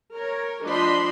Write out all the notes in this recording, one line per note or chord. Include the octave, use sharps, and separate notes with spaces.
A#4 C#5
F3 D4 D#5 B5 C6